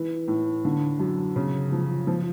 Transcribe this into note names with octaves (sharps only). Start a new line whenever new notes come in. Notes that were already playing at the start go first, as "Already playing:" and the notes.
Already playing: E3
A2
D3
F#2
C#3
F3
F3